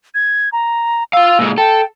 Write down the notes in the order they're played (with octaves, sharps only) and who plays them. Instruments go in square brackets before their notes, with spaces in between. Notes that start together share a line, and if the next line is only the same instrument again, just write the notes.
[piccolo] G#6
A#5
[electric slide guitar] F4 F5 [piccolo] E6
[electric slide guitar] A#2 G#3
[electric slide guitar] A4 [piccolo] G5